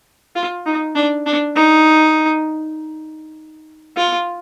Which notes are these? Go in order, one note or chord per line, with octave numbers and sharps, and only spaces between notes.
F4
D#4
D4
D4
D#4
F4